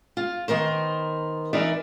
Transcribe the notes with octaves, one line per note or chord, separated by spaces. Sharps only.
F4
D#3 B3 A#4 C5
E3 D#4 A#4 B4 D5 E5